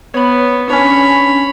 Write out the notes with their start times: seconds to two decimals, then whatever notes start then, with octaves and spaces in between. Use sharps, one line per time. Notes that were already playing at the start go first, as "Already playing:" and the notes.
0.14 B3 C#5 B5
0.70 C#4 D4 C#5 B5